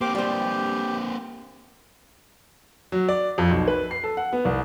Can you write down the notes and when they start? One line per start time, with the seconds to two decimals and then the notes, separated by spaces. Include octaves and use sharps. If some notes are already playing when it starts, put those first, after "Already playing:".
0.01 A#3 C4 G4 C5 D6
0.15 G3 G4 C5
2.92 F#3
3.08 D5
3.38 F2
3.51 B1
3.68 B4
3.91 C7
4.04 A4
4.17 F#5
4.33 B3
4.45 C2